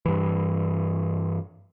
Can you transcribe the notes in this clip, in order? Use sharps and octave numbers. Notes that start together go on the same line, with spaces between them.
G2 E3